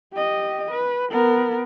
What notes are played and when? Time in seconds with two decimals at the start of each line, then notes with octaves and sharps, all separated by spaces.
0.13 G4 D#5
0.71 B4
1.11 B3 A#4